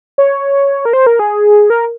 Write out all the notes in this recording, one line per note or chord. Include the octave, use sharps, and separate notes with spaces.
C#5
A#4
C5
A#4
G#4
A#4